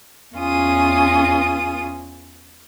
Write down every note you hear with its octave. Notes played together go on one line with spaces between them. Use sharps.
E2 C#4 F4 G#4 D#6